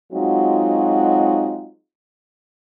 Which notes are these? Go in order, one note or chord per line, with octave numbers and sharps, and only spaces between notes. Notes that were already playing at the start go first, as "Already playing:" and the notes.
F#3 G#3 C4 D#4 F4 F#4